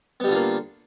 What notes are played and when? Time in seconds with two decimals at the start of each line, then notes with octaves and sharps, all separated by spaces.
0.20 B3
0.24 G3
0.28 D3
0.32 F4
0.35 A#3